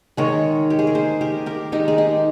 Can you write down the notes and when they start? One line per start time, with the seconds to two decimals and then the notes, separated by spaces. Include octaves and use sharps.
0.17 D#3 G#3 A#4 C#5
0.70 G4
0.79 G#4
0.87 A#4
0.95 G#4 C5
1.21 G4 A#4
1.46 G4 A#4
1.72 D#3 G#3 D#4 G4
1.88 G#4
1.98 D#4 G4